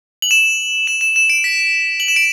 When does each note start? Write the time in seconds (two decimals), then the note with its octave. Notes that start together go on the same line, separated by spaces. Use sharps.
0.22 F#7
0.31 E7
0.87 E7
1.01 E7
1.16 E7
1.30 D7
1.44 B6
2.00 F#7
2.08 E7
2.16 D7